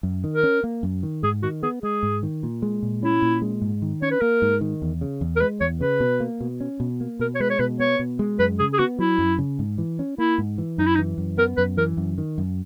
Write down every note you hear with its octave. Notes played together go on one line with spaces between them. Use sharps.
F#2
D#3
A#4
C#4
A#3
F#2
D#3
G#2 G#4
D#3 F#4
B3 G#4
G#3 G#4
G#2
D#3
A#2
G#3
A#2
C#4 E4
A#2
G#3
G#2
D#3
C#4 C#5
B4
A#3 A#4
G#2
D#3
E2
C#3
E2
A#4
G#3 B4
E2 C#5
C#3 B4
B2
A#3
B2
C#4
B2
A#3
B2 A#4
C#5
G#3 B4
C#5
B2 B4
B3 C#5
B2
G#3
F#2 B4
C#3 G#4
G#4
B3 F#4
F#3 E4
F#2
C#3
G#2
E3
C#4
A#3 E4
G#2
E3
F#2 D#4
E4
D#4
E3
F#2
B3 A#4
F#2 B4
E3 A#4
F#2
D#3
F#2